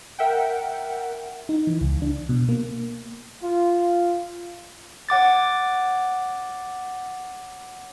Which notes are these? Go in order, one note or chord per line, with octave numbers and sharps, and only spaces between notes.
A#4 E5 F#5 G5
D#4
E3
C#2
D4
B2
A#3
F4
C#5 F#5 D6 A6